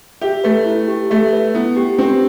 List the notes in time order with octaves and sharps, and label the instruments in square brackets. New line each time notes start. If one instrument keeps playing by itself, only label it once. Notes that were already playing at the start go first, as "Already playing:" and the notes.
[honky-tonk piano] G4 [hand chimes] E5
[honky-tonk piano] A3 [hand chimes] B4
[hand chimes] E4
G4
[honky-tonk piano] A3 [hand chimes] E5
[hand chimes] B4
[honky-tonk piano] B3 [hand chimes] E4
[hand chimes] G4
[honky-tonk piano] C4 [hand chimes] G4